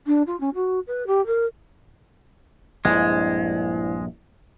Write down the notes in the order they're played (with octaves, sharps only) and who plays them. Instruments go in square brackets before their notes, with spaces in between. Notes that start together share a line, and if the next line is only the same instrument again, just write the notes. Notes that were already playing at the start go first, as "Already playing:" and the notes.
[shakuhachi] D4
F4
C#4
F#4
B4
G4
A#4
[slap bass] A#1 G2 A#2 [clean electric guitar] G#3 [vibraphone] E4 C5 D5